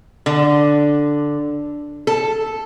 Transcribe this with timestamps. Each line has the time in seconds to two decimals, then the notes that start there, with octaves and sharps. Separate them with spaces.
0.26 D3
2.07 A4